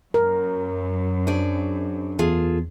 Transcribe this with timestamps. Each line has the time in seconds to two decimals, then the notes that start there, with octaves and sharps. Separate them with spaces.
0.14 F#2 A#4
1.27 D4 G#4 C5 D5
2.19 E2 F4 G#4 A4